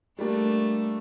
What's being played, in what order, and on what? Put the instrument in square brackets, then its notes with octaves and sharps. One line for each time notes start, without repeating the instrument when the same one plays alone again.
[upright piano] G3 A#3 D4 [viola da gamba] A3